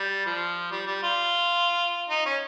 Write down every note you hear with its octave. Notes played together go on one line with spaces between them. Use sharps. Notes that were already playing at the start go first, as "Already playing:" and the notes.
Already playing: G3
F3
G3
G3
F4
D#4
C#4